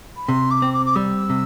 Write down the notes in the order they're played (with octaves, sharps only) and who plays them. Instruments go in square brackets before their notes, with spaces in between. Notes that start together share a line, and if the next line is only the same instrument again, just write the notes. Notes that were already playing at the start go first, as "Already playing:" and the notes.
[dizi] B5
[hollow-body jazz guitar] C3 [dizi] C6
[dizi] D6
[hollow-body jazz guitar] C4
[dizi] D6
D6
[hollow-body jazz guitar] G3 [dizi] E6
[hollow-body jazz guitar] C3